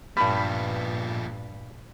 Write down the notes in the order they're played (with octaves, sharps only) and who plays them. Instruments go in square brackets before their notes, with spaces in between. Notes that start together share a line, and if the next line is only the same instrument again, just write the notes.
[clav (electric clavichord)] G2 G3 [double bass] A#2 [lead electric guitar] F3 B3 [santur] B5